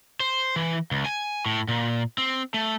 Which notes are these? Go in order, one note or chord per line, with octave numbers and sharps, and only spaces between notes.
C5
E3
C#2
G#5
A2
A#2
C4
A3